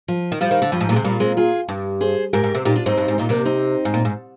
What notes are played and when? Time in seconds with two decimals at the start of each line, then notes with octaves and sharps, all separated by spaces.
0.08 F3
0.32 D#3
0.41 F3 G3
0.51 D#3
0.62 D3
0.72 G2 F3
0.80 G#2
0.89 A#2
0.93 C3 G#3
1.04 A#2 G3
1.20 G#3 C4
1.37 F4 G#4
1.68 G2
2.01 G#4 C5
2.33 G#2 G4 A#4
2.43 G#2
2.54 C3
2.65 A#2 D#4 G4
2.76 D4 F4
2.86 G#2 C4 D#4
2.97 G2
3.08 G#2
3.18 A#2 D#4
3.29 C3 A#3 D4
3.45 C4 D#4
3.85 G#2
3.94 A#2
4.05 G#2